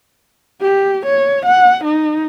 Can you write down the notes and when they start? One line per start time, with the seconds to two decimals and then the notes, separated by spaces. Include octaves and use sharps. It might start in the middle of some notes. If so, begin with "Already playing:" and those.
0.61 G4
1.05 C#5
1.45 F#5
1.84 D#4